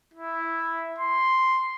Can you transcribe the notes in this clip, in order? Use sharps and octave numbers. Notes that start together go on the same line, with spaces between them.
E4
C6